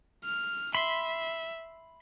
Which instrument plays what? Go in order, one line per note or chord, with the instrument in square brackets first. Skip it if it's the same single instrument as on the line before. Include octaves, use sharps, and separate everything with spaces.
[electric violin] F6
[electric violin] E5 [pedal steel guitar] B5 C6